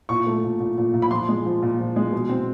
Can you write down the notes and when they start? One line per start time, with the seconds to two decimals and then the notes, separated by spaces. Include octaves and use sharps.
0.09 A#2 C#6
0.27 A3
0.44 A#2
0.60 A#2
0.78 A#2
0.94 A#2
1.02 B5
1.11 F3 C6
1.29 G#3
1.45 F3
1.62 A#2
1.79 F3
1.96 G#3
2.12 B2
2.29 C4